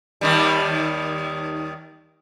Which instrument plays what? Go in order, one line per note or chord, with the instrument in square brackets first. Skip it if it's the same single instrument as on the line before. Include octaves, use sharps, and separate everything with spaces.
[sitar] D#2 D#3 G3